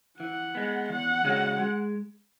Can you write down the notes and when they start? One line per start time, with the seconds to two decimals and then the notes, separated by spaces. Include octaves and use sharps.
0.20 E3 F#5
0.55 G#3 B3
0.89 E2 F#5
1.24 C#3 G#3 C#4 F#4
1.59 G#3